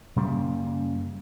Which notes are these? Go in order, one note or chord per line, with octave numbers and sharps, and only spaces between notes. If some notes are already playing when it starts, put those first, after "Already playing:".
F#2 C#3 G3 A#3